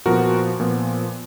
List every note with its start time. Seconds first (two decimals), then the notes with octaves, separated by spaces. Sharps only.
0.06 A#2 F3 B3 F#4 A#4
0.60 A#2 F3 B3